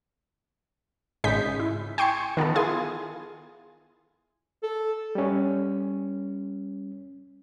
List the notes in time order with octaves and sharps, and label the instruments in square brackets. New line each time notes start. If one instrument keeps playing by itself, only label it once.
[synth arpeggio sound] G#1 C#3 G#3 D#5 G6 B6
E4
G5 G#5 C6 C#6 C#7
D#3 B3 F4 A4
E4 F4 G#4 G#5 C6
[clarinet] A4
[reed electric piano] G3 C#4